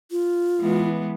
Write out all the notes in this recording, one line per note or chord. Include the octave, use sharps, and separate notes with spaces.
F4
E3 G#3 B3